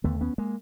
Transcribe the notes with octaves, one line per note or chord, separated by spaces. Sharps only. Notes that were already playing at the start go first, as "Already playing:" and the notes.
D#2 D3 A3 B3
B3 C#4
G#3 A#3